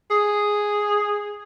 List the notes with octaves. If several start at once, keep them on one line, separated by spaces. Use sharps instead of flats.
G#4